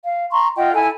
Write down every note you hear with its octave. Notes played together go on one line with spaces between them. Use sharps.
F5
A#5 C6 C#6
F4 D#5 F#5 G5
E4 A4 G#5